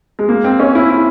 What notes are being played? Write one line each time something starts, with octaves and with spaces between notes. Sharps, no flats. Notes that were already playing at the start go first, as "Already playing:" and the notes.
G#3
A#3
C4
C#4
E4
E4